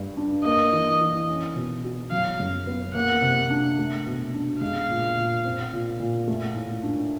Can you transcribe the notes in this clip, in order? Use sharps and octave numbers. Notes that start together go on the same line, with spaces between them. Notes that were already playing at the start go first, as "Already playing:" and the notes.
Already playing: G2
D4
A#3 D#5
E3
E3
C#4
B2
F#4
F#3 F5
F#2
B3
A#3 F#5
C3
D4
A3
B2
D4
G#3 F5
A#2
A#2
C4
A#2
A#2
A3
A2
D4